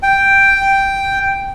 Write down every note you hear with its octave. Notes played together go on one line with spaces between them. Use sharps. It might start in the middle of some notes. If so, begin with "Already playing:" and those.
G5